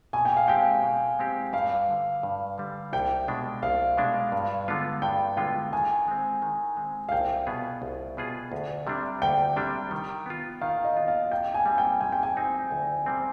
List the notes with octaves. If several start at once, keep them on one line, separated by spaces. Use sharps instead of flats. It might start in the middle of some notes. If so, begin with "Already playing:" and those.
B2 G#5
G5
F5
G#3 C4 G4 G5
B2
G#3 C4 G4
G2 F5
D3 G3
G2
D3 G3
C2 G5
B2 G#3 D4
C2 F5
B2 G#3 D4
G2
D3 G#3 B3 F4
G2 G5
D3 G#3 B3 F4 G5
D#3 G#5
G#3 C4
D#3
G#3 C4
F5
C2 G5
B2 B3 F4 G#4
C2
B2 B3 F4 G#4
D2
C3 G3 D4
D2 G5
C3 G3 D4
D#3
B3 F4
D#3 F5
D#5
B3 F4
F5
C3 G5
G#5
G3 C4 D#4
G5
C3 G#5
G5
G#5
G3 C4 D#4
D2
C3 G3 C4